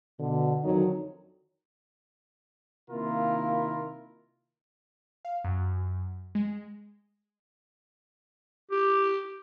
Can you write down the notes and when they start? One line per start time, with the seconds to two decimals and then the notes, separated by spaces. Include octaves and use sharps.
0.20 B2 D3
0.64 F2 D3 D#3 F#3 D#4
2.91 C3 D#3 A#3 E4 F4 A#4
5.25 F5
5.44 F#2
6.35 G#3
8.71 G4